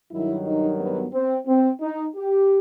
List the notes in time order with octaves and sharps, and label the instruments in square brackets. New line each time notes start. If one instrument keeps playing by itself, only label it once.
[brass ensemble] G2 D#3 F#3 E4
D#4
B3
C4
C4
D#4
G4